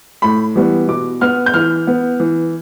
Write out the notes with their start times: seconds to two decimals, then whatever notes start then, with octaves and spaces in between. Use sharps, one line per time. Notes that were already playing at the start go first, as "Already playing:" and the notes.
0.22 A2 B5
0.55 E3 G3 B3
0.88 B2 D6
1.21 B3 F6
1.46 G6
1.54 E3 F6
1.87 B3
2.20 E3